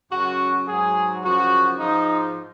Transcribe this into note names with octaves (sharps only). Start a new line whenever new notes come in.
F#2 C#3 F#3 F#4
G#2 F#3 G#4
F#2 C#3 F3 F#4
G#2 F3 D#4